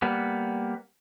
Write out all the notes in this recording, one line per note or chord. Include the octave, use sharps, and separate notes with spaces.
G3 A#3 B3